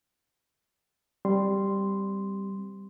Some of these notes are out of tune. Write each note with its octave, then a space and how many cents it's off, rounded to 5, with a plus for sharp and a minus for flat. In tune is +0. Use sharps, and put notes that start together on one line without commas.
G3 +0 C4 +0 C6 -5